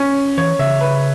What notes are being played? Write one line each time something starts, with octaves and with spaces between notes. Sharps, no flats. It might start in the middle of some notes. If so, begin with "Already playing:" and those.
Already playing: C#4
E3 C#5
C#3 E5
B4